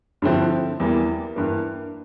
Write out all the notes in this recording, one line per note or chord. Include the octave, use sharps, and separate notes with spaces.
G2 D3 F3 C4 E4
E2 E3 G3 A#3
G2 E3 A#3